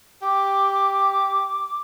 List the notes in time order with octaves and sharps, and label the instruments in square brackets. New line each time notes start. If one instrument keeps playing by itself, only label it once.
[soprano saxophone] G4 [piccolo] D6